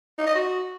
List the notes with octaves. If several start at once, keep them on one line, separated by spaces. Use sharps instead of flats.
D#4
D#5
F#4